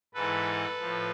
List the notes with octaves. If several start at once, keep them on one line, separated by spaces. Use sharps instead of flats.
G#2 E3 A4 B4
A2 F3